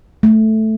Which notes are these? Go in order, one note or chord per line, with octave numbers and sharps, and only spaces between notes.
A3